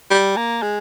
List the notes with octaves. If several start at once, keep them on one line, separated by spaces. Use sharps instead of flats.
G3
A#3
G#3